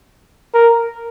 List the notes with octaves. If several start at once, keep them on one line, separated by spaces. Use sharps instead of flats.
A#4